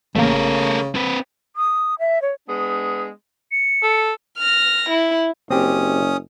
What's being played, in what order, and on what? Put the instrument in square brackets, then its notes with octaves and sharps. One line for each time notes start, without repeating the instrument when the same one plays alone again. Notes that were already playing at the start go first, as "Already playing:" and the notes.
[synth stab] A1 A#3 [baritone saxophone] C#3 [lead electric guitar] A3 A#4
[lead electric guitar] C4 B4
[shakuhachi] D#6
E5
C#5
[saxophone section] G#3 B3 D4 G#4
[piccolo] C#7
[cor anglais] A4
[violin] F6 A#6
E4
[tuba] F#1 [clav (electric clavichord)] C4 G4 [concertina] C#4 D#6